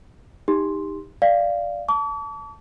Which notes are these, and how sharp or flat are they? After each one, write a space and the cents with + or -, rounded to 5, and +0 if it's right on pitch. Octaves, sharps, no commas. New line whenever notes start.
D#4 +10 G4 +20 C6 +0
D5 +0 F5 -15
A5 +0 D6 -45